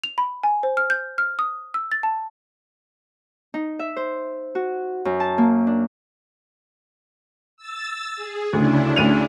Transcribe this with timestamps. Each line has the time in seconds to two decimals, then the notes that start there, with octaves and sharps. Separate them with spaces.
0.04 F7
0.18 B5
0.43 G#5
0.63 C5
0.77 F6
0.90 G6
1.18 F6
1.39 D#6
1.74 E6
1.92 A6
2.03 A5
3.54 D#4
3.79 E5
3.96 C5
4.55 F#4
5.05 F#2
5.20 A5
5.38 A#3
5.67 D4
7.57 E6 A6
8.16 G#4
8.53 D2 C#3 D4 E4
8.96 D2 D#7 F7